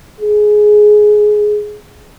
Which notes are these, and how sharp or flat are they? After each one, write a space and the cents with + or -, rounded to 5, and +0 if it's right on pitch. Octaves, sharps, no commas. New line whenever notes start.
G#4 +15